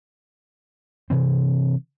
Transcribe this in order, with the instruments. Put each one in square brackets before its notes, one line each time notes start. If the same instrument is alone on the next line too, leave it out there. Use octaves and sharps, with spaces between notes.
[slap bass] C3 E3 C4